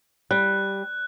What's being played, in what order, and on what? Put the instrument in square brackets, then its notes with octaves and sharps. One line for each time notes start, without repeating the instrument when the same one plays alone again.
[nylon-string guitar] G3 [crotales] F#6